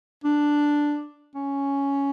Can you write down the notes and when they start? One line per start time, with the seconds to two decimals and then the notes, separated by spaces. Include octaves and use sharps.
0.24 D4
1.35 C#4